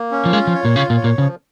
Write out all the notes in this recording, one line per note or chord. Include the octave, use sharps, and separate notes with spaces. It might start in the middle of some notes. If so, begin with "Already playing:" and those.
Already playing: A#3
C#4
F3
G#3 F4
F3
C#5
A#2
C#3 F4
A#2
C#5
A#2
C#3 F3